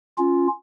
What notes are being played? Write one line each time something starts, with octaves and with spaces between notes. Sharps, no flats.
C#4 F4